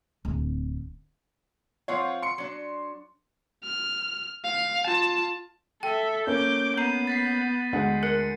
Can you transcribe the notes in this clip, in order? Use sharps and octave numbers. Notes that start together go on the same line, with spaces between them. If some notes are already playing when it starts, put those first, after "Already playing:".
D1 C4
F3 C4 F4 C#5 F5 F#5
C6 C#7
F#3 D4
F6
F5
F4 A5
A4 E5 G5
A#3 C#4 D6 G6
B3 A#5 G6 C7 D#7
A6 B6 C7
D2 G#3 F#5
A#4 C#7